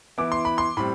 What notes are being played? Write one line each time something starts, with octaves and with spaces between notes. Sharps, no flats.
E3 B3 E4 D6
C6
B5
C6
A2 G3 C4 B5